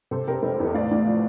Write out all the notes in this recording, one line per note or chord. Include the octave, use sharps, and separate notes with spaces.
C3 A4 C5
F1 G4 A#4
F1 A4
G4
E2
A4
A2 D5 F5
A2
F3